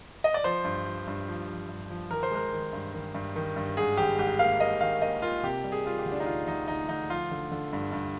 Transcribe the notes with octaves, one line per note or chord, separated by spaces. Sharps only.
D#5
D5
F3 C5
G2
F3
G2
F3
F3
G2
F3
D#3 A#4
C5
G#3 A#4
D#3
G2
D#3
G2
D#3
G2
G#2 G#4
G#1 G4
G#2 G4
A#3 F5
A#3 D#5
D#3 F5
A#3 D#5
A#3 F4
C3 G4
G3
G#4
G3 F4
G4
D2
D4
D#4
D2 F4
D2 D#4
D2 D#4
D2 D#4
F3 F4
D3
D3
G2
G2